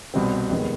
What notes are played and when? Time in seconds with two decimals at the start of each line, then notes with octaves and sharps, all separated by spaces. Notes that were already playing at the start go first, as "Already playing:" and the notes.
0.14 C2 B2 G3 C4
0.50 F1 D#2 D#3 G#3 B3